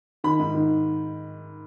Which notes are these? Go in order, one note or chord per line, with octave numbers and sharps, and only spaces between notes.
D#3 B5
G#2
D#3